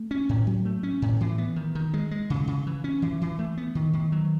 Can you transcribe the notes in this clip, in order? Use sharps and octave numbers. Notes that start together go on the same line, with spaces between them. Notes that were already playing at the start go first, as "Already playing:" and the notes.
Already playing: A3
C#4
A2
F#3
A3
C#4
A2
E3
B3
D#3
D#3
G#3
G#3
C#3
C#3
E3
C#4
E3
E3
A3
B3
D#3
D#3
F#3